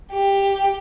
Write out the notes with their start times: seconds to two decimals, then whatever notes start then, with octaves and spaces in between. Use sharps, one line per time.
0.12 G4